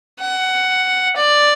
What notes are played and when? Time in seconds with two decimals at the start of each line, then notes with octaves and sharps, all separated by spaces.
0.20 F#5
1.16 D5